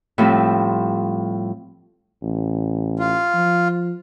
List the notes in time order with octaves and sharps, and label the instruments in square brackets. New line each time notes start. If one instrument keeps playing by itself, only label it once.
[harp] A2 F3 G3 C4
[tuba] A1
[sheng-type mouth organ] F4
[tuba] F3